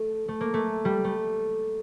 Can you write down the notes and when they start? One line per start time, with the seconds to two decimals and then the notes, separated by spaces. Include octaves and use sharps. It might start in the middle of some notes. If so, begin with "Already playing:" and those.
Already playing: A3
0.28 A3
0.41 A#3
0.54 A3
0.85 G3
1.04 A3